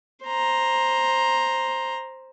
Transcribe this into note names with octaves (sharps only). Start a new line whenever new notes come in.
C5 A#5